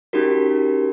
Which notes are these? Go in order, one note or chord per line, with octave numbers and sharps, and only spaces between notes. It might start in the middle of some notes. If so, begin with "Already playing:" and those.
C#4 D#4 F#4 G4 A#4